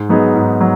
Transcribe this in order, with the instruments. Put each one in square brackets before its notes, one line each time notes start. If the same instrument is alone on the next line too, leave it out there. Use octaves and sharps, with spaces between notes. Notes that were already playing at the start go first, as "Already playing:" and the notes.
Already playing: [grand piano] G#2
F#3 B3 D#4 G#4
G#2
F#3